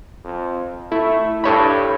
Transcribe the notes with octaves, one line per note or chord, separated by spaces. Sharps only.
F2
A3 E4
G2 A4 C#5 B5